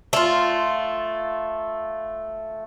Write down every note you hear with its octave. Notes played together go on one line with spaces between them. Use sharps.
A3 F4